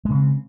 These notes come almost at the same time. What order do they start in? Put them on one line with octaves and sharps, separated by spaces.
G#3 C#3 C4